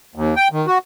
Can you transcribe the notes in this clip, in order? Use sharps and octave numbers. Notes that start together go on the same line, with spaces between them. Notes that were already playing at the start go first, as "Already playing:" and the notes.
D#2
G5
D#3
F#4